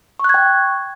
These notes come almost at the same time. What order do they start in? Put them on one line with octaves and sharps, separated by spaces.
C#6 F#6 G#6 G5